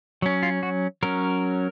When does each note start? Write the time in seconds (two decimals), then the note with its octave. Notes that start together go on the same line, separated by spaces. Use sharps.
0.22 F#3 C#4
0.43 F4
0.63 F#4
1.03 F#3 C#4 A#4